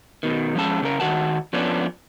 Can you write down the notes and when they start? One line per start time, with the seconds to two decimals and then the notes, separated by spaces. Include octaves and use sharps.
0.23 B2 D#3
0.55 F3 G#3 C#4 A5
0.82 C#3 C#4 A#4
1.00 D#3 F#4 F#5 A5
1.53 F3 B3 C#4 D4